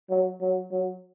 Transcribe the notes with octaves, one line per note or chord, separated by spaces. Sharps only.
F#3
F#3
F#3